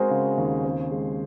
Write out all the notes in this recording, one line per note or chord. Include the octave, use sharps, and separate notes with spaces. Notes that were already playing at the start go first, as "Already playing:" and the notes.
Already playing: G#3 C4 F#4 G#4 A#4 C5
C#3
D#2
C4
G#3